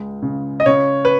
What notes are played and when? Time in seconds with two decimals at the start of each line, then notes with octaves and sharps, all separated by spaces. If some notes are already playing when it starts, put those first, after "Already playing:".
Already playing: C#2 G#3
0.22 C#3
0.60 D#5
0.66 C#3 C#5
1.05 B4